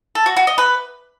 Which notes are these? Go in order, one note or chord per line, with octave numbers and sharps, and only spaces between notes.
A4
F#4
F#4
D#5
B4